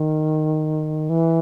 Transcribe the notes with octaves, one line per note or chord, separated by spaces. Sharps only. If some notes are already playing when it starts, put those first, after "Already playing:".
Already playing: D#3
E3